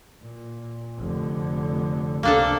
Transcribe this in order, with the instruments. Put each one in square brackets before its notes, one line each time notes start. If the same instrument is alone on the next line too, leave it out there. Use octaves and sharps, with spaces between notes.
[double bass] A#2
F1 D3
[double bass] C#2 C3 [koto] A#3 D4 A4